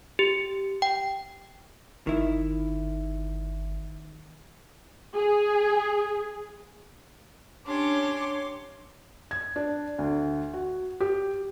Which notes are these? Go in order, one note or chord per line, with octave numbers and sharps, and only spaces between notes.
G4
G5
G1 D#3 E4
G#4
C#4 D4 G4 C#5 C6 D6
G#6
D4
D2
F#4
G4